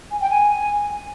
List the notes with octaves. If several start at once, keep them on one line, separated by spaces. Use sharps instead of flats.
G#5
G5
G#5